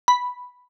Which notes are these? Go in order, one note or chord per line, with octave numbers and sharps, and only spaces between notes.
B5